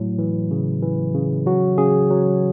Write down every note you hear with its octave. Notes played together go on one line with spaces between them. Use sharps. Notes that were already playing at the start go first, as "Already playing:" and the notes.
Already playing: A2 F#3
E3
C#3
E3
C#3
F#3 F#4
C#3 G#4
F#3